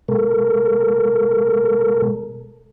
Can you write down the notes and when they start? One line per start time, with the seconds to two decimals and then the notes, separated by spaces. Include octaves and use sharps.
0.08 B2 G#3 A4 A#4